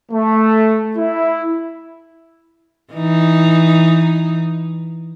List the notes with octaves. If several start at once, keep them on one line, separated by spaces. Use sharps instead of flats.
A3
E4
E3 D#4